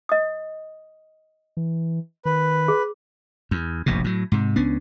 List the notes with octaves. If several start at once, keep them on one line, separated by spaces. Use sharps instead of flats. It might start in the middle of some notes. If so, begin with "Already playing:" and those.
D#5 D#6
E3
D#3 B4
G#4
E2
F1 A#1 G2 B2
A2 F#3
G#2 C3
C#2 B3 C#4 D4